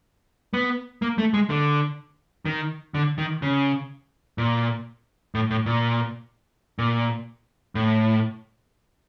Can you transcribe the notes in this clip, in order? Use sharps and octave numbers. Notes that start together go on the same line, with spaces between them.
B3
A#3
A3
G#3
D3
D#3
D3
D#3
C#3
A#2
A2
A2
A#2
A#2
A2